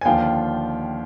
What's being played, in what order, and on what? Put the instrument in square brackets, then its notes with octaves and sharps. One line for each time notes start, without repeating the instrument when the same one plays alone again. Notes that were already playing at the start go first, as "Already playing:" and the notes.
[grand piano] G#5
D#2 D3 F3 F5 G5